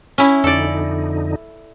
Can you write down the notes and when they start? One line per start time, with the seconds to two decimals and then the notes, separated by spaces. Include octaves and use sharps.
0.18 C#4 E4
0.44 F2 D3 D#4 A4 D5